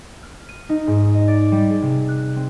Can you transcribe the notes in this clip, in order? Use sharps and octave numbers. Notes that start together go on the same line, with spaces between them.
F6
D#7
D#4
G#2
D#5
D5
G3
G#4
C3
F#6
C4